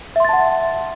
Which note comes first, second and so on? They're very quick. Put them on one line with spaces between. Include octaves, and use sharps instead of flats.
E5 C6 A6 A5 F#5